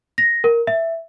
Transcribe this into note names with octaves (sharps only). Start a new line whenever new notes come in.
A#6
A#4
E5